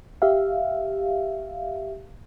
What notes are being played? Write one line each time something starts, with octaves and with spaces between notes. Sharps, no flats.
G4 E5 F5